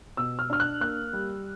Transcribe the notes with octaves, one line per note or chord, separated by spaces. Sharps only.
B2 E6
F6
D4 F6
F#6
A#3 F#6
G3